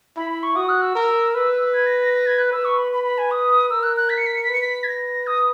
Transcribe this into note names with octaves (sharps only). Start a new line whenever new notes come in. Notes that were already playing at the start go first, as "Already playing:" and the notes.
E4 B5
B5
C#6
F#4 D#6
F#6
E6
A#4
B4
G#6
A#6
A#6
A#6
G#6
F#6
B4 E6
C#6
B5
B5
B5
G#5
D#6
A#4 E6
F#6
F#6
B6
C#7
B6
C#7
B6
B4 C#7
B6
G#6
A#6
D#6